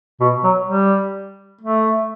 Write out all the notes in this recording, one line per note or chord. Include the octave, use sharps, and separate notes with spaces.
B2
F#3
G3
A3